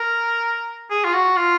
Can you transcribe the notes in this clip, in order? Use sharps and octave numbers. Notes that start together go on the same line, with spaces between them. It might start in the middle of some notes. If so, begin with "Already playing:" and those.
Already playing: A#4
G#4
F4
F#4
F4